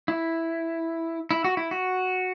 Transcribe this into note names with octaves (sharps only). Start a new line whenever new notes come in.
E4
E4
F#4
E4
F#4